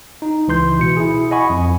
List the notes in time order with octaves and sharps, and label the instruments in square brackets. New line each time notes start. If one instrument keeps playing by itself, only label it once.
[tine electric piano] D#4
C#2 E3 C6 G6
B2 C#7
E4 G#4
D#5 F#5 G#5 B5 C#6
F2